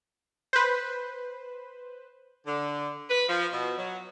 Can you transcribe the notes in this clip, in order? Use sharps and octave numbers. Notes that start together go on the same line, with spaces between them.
B4 C5
D3
B4
F3
B2
F#3